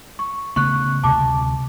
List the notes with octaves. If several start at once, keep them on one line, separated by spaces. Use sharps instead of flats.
C#6
C#3 A3 B3 C#6 F#6
D2 C3 A5 D6